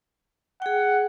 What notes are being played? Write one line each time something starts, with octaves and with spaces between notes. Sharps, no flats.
G#4 F#5 G5